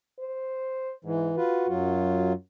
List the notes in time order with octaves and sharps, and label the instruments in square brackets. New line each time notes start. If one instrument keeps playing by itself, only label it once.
[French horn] C5
[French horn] G#2 [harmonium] E3
[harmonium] F4 B4 [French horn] F#4
[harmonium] F#2 F#3 F4